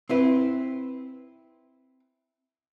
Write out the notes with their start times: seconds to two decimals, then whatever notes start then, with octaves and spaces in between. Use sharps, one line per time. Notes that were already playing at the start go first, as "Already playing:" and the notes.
0.09 C4 E4 B4